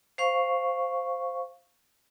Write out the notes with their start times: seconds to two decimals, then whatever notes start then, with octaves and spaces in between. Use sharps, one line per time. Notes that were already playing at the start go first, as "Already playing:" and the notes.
0.18 C5 F5 C#6